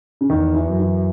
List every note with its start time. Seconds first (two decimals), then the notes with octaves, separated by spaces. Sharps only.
0.21 C#3
0.30 E2 D#3
0.54 E3
0.67 F#2
0.80 E3